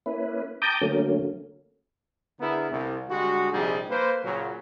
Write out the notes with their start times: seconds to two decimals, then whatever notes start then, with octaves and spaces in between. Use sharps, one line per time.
0.06 A#3 C#4 E4 B4
0.62 G5 A5 A#5 D6 D#6 G6
0.81 D3 F#3 A3 A#3 C#4
2.40 D3 B3 E4 G#4 A#4
2.70 C2
3.08 D3 G3 G#3 F#4
3.51 A#1 C3 G3 D#4 G#4
3.89 A#3 B4 C5
4.24 A#2 C#3 F#3